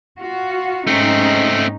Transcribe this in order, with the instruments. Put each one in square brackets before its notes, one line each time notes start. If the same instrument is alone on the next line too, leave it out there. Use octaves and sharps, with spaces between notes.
[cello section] F4 F#4
[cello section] G#2 C#4 D#4 [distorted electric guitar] A3 C4